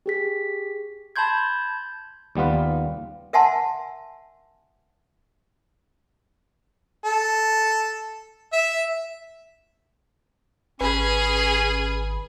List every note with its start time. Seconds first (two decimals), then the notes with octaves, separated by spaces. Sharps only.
0.06 G4 G#4 B6
1.16 A5 B5 C6 G6 G#6
2.35 D#2 G3 B3 F4 B4
3.33 A#4 E5 F#5 G#5 A5 C6
7.05 A4
8.53 E5
10.81 G#1 C#4 G#4 B4 B5